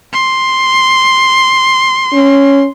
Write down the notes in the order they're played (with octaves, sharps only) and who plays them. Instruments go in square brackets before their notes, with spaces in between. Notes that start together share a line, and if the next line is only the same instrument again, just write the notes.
[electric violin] C6
[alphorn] C#4